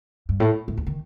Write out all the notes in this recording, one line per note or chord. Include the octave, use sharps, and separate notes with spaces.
G2
A2
A2
E2
D#3